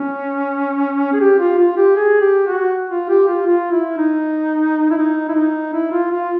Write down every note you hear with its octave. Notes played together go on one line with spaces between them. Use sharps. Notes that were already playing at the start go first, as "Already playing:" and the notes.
Already playing: C#4
G#4
G4
F4
F4
G4
G#4
G4
F#4
F4
G4
F4
F4
E4
D#4
E4
D#4
E4
D#4
E4
F4
F4